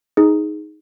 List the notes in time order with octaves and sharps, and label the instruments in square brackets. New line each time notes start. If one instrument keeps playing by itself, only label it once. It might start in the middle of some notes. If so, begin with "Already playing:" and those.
[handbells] D#4 G#4